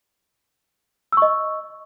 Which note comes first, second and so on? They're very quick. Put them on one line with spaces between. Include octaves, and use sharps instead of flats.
E6 C#6 D#5